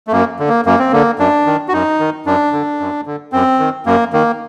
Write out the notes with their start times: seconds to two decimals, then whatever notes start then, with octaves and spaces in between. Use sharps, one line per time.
0.07 A3
0.12 F#2 A#3
0.39 D3
0.49 A#3
0.66 F#2 A#3
0.79 C4
0.92 D3 A#3
1.19 F#2 D4
1.46 D#3
1.68 F#4
1.73 F#2 D#4
2.00 D#3
2.26 F#2 D4
2.52 D3
2.80 F#2
3.06 D3
3.32 F#2 C4
3.59 D#3
3.86 F#2 A#3
4.13 D#3 A#3